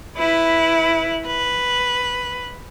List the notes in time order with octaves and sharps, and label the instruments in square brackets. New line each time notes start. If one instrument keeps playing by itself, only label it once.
[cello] E4 B4
B4